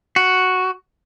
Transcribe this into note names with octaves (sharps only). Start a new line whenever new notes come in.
F#4